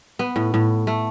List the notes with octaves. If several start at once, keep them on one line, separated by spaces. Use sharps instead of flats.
B3
A2
A2
A3